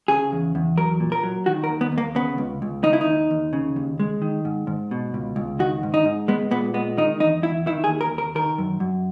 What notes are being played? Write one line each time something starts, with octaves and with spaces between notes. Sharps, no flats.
C#3 G#4
E2
E2
F#3 A#4
A#2
A#4
F#3
D#3 F#4
A#4
D#2
B3
D#2
A#3
C#3 B3
C#2
C#2
D#3 D#4
E4
D#4
D#2
D#2
C#3
D#2
G#3
D#3
G#2
G#2
B2
C#2
C#2
D#3 F#4
G#2
D#4
G#2
G#3 B3
A#2 B3
G#3 B3
D#3 D#4
E2 D#4
E2 E4
D#3 E4
G#4
D#2
A#4
D#2
A#4
D#3 A#4
F#2
F#2